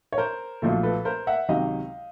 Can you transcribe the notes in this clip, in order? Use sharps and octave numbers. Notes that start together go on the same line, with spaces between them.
C#5
A#4 C5
B1 A#2 F3 A3
A4 B4
A#4 C5
E5 F#5
C#2 C3 D#3 F#3 D#5 F5